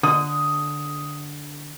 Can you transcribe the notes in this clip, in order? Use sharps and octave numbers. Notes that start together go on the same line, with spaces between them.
D3 D#6